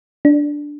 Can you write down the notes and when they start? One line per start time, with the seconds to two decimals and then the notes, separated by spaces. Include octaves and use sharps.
0.25 D4